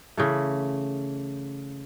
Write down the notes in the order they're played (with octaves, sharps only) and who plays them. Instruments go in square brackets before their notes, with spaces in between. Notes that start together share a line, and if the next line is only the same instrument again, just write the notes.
[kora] C#3 E3 A3